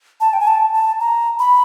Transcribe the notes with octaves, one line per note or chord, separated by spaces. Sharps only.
A5
G5
G#5
A5
A5
A#5
B5